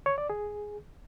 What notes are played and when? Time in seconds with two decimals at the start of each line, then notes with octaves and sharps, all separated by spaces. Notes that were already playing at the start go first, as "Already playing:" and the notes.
0.06 C#5
0.18 D5
0.30 G#4